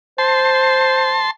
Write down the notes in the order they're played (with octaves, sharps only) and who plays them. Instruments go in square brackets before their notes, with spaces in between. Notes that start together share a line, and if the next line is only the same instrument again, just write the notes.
[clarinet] C5 [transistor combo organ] A5 C6